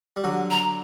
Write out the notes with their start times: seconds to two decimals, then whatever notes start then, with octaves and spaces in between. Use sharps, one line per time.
0.16 G3
0.24 D3 F#3
0.51 A#5